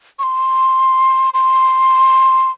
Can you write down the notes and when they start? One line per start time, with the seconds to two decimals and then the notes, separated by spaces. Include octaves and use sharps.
0.19 C#6
0.23 C6
1.34 C6